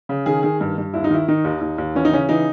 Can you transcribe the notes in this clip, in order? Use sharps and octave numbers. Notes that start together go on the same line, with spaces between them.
C#3
D#3 G#4
D#3 G#4
G2
G2
D#2 E4
D#4
D#3 E4
D#3 D#4
D#2
D#2
D#2
E3 C#4
D#4
C#3 C#4
E3 D#4